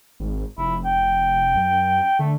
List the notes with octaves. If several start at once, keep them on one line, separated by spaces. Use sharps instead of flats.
G#1
F1 E4
G5
F#2
D3 A3